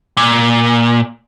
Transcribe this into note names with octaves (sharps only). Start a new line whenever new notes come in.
A#2